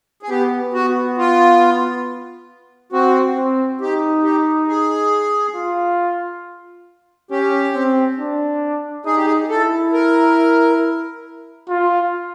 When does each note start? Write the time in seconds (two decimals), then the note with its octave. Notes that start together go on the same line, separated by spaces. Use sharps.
0.23 G#4
0.30 B3 G4
0.73 B3 F#4
1.18 F4
2.92 C4 F#4
3.37 C4
3.81 D#4 G4
4.23 G4
4.68 G#4
5.55 F4
7.31 C#4 G4
7.75 C4
8.18 D4
9.05 D#4 G#4
9.16 G4
9.25 G#4
9.49 E4 A4
9.93 A#4
11.69 F4